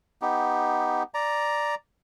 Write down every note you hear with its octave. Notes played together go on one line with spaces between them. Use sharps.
B3 D#4 G4
D5 A#5